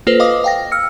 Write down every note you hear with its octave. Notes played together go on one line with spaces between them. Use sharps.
A#3 F4 A4 B4 C5
D#5 F5 D6 D#6
F5 G5 A#6
E6 F6 C#7